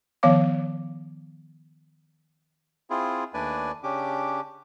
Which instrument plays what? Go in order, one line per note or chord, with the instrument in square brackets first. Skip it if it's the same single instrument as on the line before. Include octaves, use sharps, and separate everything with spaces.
[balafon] D#3 F3 B3 C#5 F5 D6
[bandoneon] C4 E4 F4 G#4
D#2 A3 D4 B4 D5 G#5
C#3 C#4 D4 G4 D6